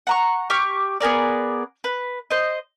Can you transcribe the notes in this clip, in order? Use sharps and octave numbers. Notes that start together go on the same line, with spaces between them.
F#5 A#5 C#6
G4 C#6 D6 F6
B3 G#4 A#4 D5
B4
C5 D#5